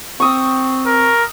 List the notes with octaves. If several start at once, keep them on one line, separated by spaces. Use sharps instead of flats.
C4 C#6 D#6 E6
A#4